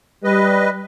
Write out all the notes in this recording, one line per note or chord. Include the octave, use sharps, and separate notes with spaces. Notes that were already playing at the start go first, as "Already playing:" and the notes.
G3 B4 D#5